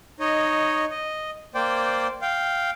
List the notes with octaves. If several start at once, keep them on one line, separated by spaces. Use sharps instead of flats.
D#4 C#5 D#5
D#5
A#3 C5 D5 G5
F5 G5